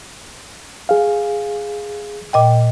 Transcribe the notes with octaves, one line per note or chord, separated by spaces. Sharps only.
G#4 F5
A#2 D#5 G5